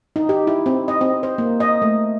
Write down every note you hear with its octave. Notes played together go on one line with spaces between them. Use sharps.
D#4
G4
E4
C4
D#5
C4
C5
A#3
D#5
A3